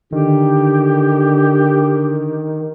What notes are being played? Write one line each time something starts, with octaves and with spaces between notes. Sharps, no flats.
D3 D#3 G4